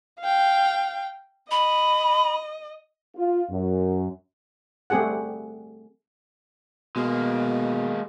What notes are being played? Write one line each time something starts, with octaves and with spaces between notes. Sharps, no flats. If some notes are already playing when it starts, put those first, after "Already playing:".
F5 G5
D#5 B5
F4
F#2
G3 A3 C4 G4 G#4 F#5
B2 G#3 A#3